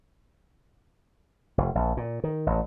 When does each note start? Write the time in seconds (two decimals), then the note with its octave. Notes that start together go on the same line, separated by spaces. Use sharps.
1.58 F1
1.75 A#1
1.97 A#2
2.24 D#3
2.46 A1